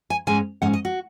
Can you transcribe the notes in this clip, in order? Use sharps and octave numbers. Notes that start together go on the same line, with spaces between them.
G#5
G#2 G#3 C#4 G#5
G#2 G#3 C#4 F#5
D#5
F#4